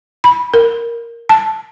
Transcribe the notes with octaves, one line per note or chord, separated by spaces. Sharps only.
B5
A#4
A5